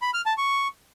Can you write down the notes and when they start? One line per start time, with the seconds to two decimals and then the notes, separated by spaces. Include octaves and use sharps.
0.02 B5
0.14 F6
0.26 A5
0.38 C#6